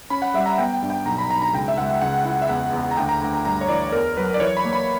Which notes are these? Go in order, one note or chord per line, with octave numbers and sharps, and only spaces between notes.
C#4 B5
F#5
G3 E5
A#5
B3 G5
G5
G2
G5
B1 A#5
B5
B1 A#5
A#5
C#2 G5
E5
C#2 F#5
C#2 F#5
E4
E5
E2 F#5
E2
A#5
D2 G5
A#5
D2 A#5
A#5
G2 A#5
C#5
E3 D5
E2 A#4
F#3 B4
D5
E3 C#5
B5
A#3
B5